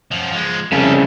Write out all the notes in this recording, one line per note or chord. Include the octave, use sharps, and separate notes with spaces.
F#2 F3
F3 G#3
C2 F2 C#3 A4